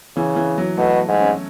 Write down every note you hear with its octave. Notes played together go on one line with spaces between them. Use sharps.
C#3 E3
E3
F#3
B2 A3
G#2
C#4